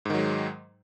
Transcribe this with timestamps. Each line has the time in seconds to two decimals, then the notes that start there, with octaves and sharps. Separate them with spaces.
0.05 G#2
0.10 D#3
0.14 F#3
0.19 G#3